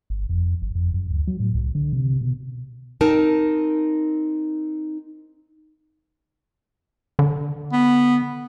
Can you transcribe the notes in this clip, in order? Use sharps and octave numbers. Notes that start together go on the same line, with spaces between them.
G1
F2
G1
F2
F#2
D2
F#3
A2
C2
D3
C3
B2
C4 D#4 A#4 A5
D3
B3